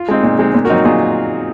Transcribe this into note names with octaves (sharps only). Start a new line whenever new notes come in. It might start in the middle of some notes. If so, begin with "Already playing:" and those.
Already playing: F4
G#3 C4 D#4
A#2
G#3 C4 D#4
A#2
F#4 A#4
F#3 C4 D#4
A#2 F4 G#4